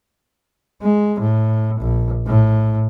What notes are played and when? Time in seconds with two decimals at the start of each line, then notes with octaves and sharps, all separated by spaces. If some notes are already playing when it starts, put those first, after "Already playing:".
0.82 G#3
1.20 A2
1.80 A#1
2.26 A2